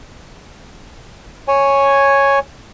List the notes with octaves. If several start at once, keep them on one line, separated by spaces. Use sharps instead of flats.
C#5 G#5